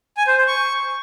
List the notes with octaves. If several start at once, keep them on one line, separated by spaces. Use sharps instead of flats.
G#5
C5
C5
C#6